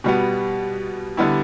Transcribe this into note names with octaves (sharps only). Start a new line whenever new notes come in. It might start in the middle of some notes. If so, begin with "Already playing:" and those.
B2 G3 B3
D3 G3 B3 E4